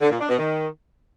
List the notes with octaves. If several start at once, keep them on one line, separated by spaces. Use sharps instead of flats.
D3
A#2
D4
B2
D#3